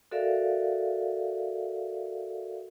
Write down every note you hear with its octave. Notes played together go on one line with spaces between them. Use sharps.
F#4 A4 A#4 D5 E5 F5